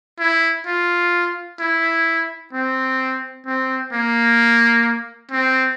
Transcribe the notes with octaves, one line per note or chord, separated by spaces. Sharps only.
E4
F4
E4
C4
C4
A#3
C4